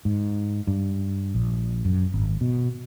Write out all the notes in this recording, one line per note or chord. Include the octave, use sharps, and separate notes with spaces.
G#2
G2
A#1
F#2
G#1
B2